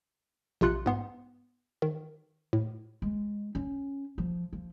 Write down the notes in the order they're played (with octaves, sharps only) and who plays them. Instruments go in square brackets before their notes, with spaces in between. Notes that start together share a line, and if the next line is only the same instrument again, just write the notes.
[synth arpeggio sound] A#1 C3 F4 F#6 C#7
G#2 B3 C6
D#3
A2
[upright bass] G#3
C#4
F3
F3